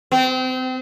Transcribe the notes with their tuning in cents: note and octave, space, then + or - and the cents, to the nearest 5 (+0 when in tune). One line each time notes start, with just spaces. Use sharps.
C4 -30